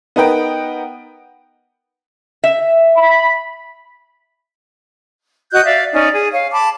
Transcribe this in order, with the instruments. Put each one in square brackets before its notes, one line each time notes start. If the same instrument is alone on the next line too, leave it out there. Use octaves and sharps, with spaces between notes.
[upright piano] B3 D#4 A#4 B4 G5
[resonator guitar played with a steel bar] E5
[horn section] B5
[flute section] F#4 D#5 F#6 G6
D5 E5 F5
C#4 D#4 D5
G#4
C#5 F5
A5 B5 D6